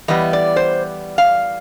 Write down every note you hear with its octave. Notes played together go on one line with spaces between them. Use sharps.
E3 G3 B3 D#5
D5
C5
F5